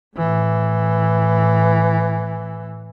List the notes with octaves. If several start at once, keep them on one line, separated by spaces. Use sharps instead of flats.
A2 E3